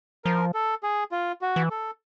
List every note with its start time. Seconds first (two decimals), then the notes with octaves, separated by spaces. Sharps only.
0.25 F3 A#4
0.54 A4
0.83 G#4
1.12 F4
1.42 F#4
1.56 E3
1.70 A4